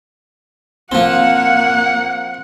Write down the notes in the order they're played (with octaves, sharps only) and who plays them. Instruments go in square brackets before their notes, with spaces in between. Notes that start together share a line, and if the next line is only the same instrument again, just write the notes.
[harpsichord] F3 C4 [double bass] A#3 [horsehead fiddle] F#5